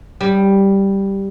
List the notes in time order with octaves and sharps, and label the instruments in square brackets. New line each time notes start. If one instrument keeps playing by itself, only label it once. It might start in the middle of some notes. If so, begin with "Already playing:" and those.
[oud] G3